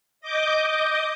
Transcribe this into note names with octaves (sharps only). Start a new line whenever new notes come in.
D#5 D6 G6